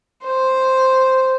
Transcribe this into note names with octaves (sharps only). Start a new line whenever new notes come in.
C5